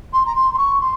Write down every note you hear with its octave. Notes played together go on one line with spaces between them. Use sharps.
C6
A#5
C6
C6
C#6
C6